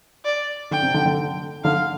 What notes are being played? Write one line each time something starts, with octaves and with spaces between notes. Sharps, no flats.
D5
D3 G5
C3
D3
D3
D3 F5